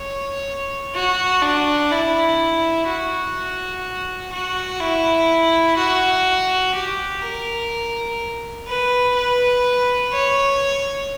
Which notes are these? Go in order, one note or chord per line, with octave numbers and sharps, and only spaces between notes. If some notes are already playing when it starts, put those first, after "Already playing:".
Already playing: C#5
F#4
D4
E4
F#4
F#4
E4
F#4
G4
A#4
B4
B4
C#5